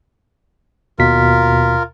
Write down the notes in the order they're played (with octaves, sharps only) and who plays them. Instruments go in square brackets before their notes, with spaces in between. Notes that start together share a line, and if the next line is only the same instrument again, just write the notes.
[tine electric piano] D#2 B2 B6 [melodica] F4 A#4